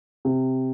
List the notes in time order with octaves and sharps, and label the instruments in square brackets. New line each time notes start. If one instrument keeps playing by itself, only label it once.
[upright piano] C3